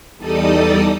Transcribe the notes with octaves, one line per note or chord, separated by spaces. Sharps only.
E2 G3 D#4 A4 D5 D#6